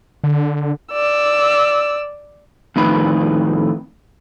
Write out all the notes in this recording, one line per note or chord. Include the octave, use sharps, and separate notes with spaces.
D3
D5 E6
F2 A2 D#3 B4